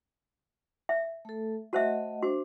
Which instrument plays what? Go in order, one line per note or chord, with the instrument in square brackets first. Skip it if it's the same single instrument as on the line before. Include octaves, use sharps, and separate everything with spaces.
[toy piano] E5
[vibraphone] A3 A4
[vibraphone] A3 D#5 F#5 [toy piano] F#4 C5 E5
[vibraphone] D4 C5 [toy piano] F#4